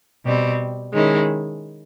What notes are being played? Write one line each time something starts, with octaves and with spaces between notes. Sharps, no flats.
B2 G3 C4
D#3 G#3 C#4 E4